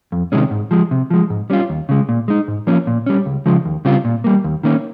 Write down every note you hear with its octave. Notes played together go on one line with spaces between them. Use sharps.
F2
C3 D#3 G#3 C#4
G#2
F3 G#3
C3
F3 G#3
G#2
G3 C#4 F4
D#2
C#3 G#3
A#2
G#3 D#4
G#2
F3 A#3 C#4
A#2
G3 C#4
C#2
C#3 F3 G#3
D#2
C#3 G3 C4 F4
A#2
G3 A#3
D#2
D#3 A#3 C#4